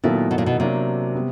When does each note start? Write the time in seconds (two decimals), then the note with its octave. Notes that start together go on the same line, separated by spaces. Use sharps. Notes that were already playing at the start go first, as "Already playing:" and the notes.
0.04 A#2 D#3 F#3 B3 E4 A4
0.31 B2
0.38 A#2
0.46 B2
0.59 C3 F#3 A#3 D4 F#4
1.15 G3 B3